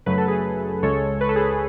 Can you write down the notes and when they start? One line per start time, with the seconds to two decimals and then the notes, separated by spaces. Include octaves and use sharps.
0.06 F#2 C#3 F#3 A3 B4
0.18 A4
0.28 G#4 B4
0.82 C#2 C#3 G#3 A4 C#5
1.21 B4
1.29 A4
1.36 G#4 B4